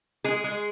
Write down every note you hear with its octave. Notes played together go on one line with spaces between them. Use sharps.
G#3 G#4
G#3